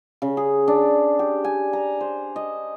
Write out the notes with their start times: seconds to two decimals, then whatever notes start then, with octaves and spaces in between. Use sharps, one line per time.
0.22 C#3
0.37 G#4
0.68 D4
1.19 G4
1.44 G#5
1.73 A#5
2.01 C5
2.36 D#5